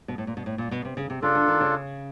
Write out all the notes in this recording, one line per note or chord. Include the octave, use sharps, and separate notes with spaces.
B2
A2
A#2
B2
A2
A#2
B2
C3
C#3
C3
C#3 D4 F4 A4
D3
D#3
C#3